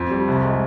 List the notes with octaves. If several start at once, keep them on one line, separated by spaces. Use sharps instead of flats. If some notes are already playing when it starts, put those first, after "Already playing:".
Already playing: F2
G3
C2
G#3